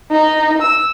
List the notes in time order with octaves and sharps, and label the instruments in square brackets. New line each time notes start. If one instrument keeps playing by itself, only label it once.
[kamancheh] D#4
E6